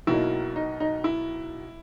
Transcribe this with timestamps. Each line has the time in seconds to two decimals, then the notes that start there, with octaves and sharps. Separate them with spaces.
0.07 B1 B2 F#3 A#3 D#4 E4
0.56 D#4
0.80 D#4
1.04 E4